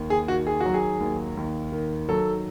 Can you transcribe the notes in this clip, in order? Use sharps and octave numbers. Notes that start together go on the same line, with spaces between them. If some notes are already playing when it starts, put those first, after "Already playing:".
Already playing: D#2
G#4
D#3 F#4
G#4
F#3 F#4
G#4
D#2
D#2
D#3
F#3 A4